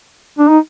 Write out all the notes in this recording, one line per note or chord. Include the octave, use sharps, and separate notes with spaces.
D4
D#4